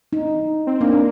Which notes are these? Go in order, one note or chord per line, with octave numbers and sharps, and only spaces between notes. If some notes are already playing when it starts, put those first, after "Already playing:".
D#4
C4
A#3 D4